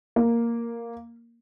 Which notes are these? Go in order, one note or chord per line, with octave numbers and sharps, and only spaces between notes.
A#3